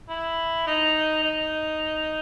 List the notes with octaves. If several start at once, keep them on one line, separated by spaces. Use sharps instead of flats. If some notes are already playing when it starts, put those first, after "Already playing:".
E4
D#4
D#4